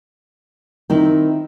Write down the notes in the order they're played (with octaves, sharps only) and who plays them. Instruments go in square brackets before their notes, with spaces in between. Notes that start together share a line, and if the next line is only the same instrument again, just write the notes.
[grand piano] D#3 [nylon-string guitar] C4 D#4 E4